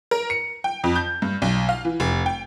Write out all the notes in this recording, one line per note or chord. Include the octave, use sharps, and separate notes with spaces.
A#4
C#7
G5
F2
G6
G2
B1
F5
E3
F1
G5